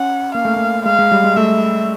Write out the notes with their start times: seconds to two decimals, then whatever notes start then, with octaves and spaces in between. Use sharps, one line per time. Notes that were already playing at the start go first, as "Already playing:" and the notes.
Already playing: C#4 F#5
0.35 A#3 F5
0.45 A3
0.56 A#3
0.86 G#3 F5
0.99 G#3
1.12 G3
1.24 G#3
1.36 A3 E5